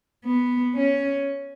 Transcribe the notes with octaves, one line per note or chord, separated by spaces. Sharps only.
B3
C#4